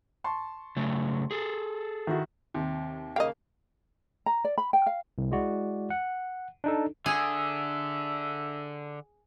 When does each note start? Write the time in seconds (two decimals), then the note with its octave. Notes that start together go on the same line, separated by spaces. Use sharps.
0.24 A5 C6 C#6
0.76 C#3 F#3 A3
1.31 G#4 A4
2.07 D#3 E4 F#4
2.54 D#2 C3
3.16 C#3 A#3 D#5 F5 G5
4.26 A#5
4.44 D5
4.58 B5
4.73 G5
4.86 F5
5.18 C2
5.31 G#3 E4 F#4 D5
5.90 F#5
6.64 D4 D#4 A4
7.06 D3 G#4 E5